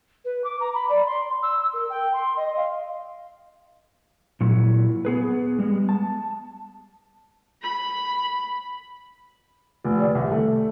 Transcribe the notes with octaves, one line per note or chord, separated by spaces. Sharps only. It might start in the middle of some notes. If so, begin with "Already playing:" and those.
B4
D6
A#5
B5
D5
C6
E6
A#4
G5
C6
D#5
F5
A#2 F#3 E4
B3 G#4 B4
G3 G#3 B3
A5
B5
F1
D5
C2
A3